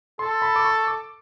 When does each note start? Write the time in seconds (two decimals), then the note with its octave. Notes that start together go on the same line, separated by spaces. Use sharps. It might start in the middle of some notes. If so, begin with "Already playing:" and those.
0.19 A4 C6
0.42 B5
0.56 D6
0.65 C#6
0.87 D6